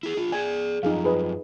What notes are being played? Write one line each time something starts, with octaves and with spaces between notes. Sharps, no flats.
E4 G#4
D4 F4
G#4 D5 G#5
F#2 F3 D#4 G#4 F5
G#4 B4 D#5